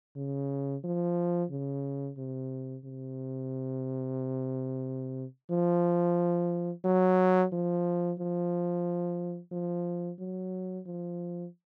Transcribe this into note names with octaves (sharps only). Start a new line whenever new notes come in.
C#3
F3
C#3
C3
C3
F3
F#3
F3
F3
F3
F#3
F3